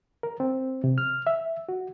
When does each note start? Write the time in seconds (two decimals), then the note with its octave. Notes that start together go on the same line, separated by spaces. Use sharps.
0.23 A#4
0.40 C4
0.84 C3
0.98 F6
1.27 E5
1.69 F#4